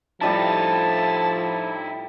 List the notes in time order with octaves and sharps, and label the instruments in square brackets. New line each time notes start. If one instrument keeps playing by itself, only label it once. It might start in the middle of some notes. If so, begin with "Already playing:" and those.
[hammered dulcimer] A2 G3 G4 [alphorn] F3 [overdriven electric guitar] D#4 E4 [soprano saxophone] A5